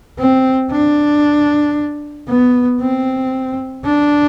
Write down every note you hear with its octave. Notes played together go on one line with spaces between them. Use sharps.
C4
D4
B3
C4
D4